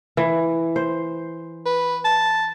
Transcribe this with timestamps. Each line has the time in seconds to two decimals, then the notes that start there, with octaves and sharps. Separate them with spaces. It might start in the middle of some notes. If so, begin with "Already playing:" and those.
0.17 E3
0.76 C5
1.66 B4
2.05 A5